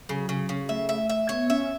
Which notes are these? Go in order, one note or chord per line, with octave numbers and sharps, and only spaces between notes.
C#3 F#3
C#3
C#3
A3 E5
E5
E5
B3 C#5
C#4 E5